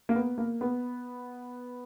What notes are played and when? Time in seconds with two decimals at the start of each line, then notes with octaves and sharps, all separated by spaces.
0.09 A#3
0.15 B3
0.38 A#3
0.61 B3